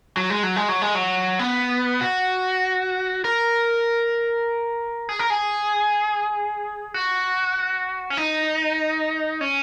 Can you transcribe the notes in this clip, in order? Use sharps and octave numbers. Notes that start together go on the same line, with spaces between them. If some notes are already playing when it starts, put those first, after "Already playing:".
F#3
G#3
F#3
G#3
F#3
G#3
F#3
B3
F#4
A#4
G#4
A#4
G#4
F#4
C#4
D#4
C#4